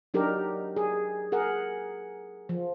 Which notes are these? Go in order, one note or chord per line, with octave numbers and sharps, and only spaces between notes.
F#3 D4 D#4 G4 A#4
G#4
G#4 A#4 F#5
F3